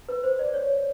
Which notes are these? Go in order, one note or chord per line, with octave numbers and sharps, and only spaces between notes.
B4
C5
D5
C#5